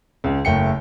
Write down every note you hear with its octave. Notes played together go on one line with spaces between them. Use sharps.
C#2
F#1 A3 G5 C#7